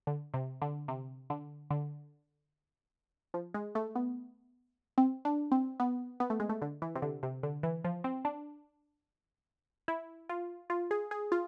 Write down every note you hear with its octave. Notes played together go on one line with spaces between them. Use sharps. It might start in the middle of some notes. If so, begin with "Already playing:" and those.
D3
C3
D3
C3
D3
D3
F3
G#3
A3
B3
C4
D4
C4
B3
B3
A3
G#3
A3
D3
E3
C3
D3
C3
D3
E3
F3
C4
D4
E4
F4
F4
G#4
G#4
F4